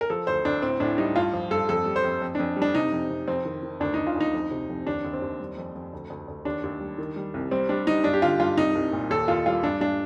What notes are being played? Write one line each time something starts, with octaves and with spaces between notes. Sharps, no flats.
A#4
F3 A4
D2 C5
D2 D4
A2 C4
A2 D4
G3 D#4
G2 F4
F3
G2 A4
F2 A4
G3
C5
F2
F2
F2 D4
G3
D4
C3 D#4
F2
C3
F2 C4
D#3
D#3
D2 D4
D2 D#4
F4
D2 D#4
F2
C3
F2
D#2 D4
D#2
C4
D#2
G3
F2
F2
D2
D2
D2
D#2 D4
D#2
G3
D#3
G3
C2
G3 C4
G3 D4
G3 D#4
G2 D4
G4
D3 F4
G2 F4
C2 D#4
C2
A#2
D#2 A4
D#2 F4
G3 F4
G2 D4
G2 D4